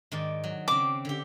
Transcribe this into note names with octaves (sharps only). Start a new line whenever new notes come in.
G#2 D#3 D5
F#3
C#3 C4 D6
D3 G4